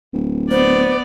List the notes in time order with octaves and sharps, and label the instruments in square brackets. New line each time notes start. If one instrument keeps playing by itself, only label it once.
[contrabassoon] D1
[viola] B3 D5 [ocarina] C5